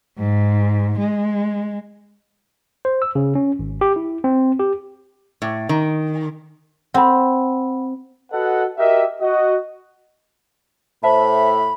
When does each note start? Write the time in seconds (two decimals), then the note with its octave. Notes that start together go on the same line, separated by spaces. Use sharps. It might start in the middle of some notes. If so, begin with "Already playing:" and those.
0.19 G#2
0.99 G#3
2.85 C5
3.02 E6
3.15 C#3
3.35 C#4
3.59 G#1
3.81 G4
3.96 E4
4.24 C4
4.60 G4
5.42 A2
5.69 D#3
6.94 C4 F#5 B5
8.32 F#4 A4 B4 D#5 F#5
8.78 F#4 G4 A#4 D#5 E5
9.21 F#4 D#5
11.03 A2 C5 E5 A5 B5